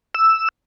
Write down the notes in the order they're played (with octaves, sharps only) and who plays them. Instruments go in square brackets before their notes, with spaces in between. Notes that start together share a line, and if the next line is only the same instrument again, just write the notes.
[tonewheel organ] E6